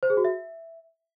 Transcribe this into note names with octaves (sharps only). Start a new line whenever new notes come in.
C5
G#4
F#4
E5